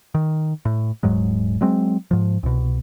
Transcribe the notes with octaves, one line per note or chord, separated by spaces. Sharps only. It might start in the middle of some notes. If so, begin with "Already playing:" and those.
D#3
A2
D#1 G#2 F#3 G#3
F#3 G#3 C4
G#2 F3
C2 B2